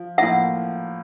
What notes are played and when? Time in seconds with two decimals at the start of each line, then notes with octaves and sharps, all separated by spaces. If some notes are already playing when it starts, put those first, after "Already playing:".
Already playing: F3
0.18 A2 F3 A#3 E5 F#5